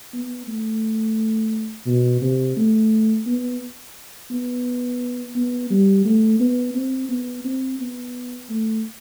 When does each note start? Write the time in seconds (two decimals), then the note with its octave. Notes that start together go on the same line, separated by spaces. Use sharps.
0.13 B3
0.47 A3
1.86 B2
2.22 C3
2.57 A3
3.26 B3
4.31 B3
5.36 B3
5.70 G3
6.05 A3
6.40 B3
6.75 C4
7.10 B3
7.44 C4
7.80 B3
8.49 A3